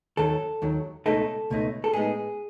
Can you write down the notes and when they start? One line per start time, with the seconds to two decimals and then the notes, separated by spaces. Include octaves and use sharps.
0.17 D#2 D#3 F#3 A4
0.62 D#2 D#3 F#3
1.06 C#2 B2 A3 D#4 A4
1.50 C#2 B2 A3 D#4
1.84 A4
1.93 A2 G#3 B3 D#4 G#4